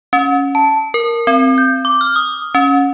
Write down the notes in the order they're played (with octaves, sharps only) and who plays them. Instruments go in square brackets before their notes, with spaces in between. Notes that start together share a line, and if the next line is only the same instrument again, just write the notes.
[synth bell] C#4
A5
A#4
C4
G6
D6
F6
D#6
C#4